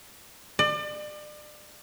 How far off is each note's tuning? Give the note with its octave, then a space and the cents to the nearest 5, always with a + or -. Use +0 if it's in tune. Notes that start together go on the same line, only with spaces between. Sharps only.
D5 +35